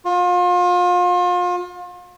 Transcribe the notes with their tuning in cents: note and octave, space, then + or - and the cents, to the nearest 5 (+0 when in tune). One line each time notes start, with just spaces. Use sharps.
F4 +35